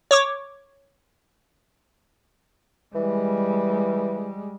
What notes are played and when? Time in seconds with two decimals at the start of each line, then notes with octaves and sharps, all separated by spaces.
0.11 C#5 C#6 D6
2.95 E3 G3 G#3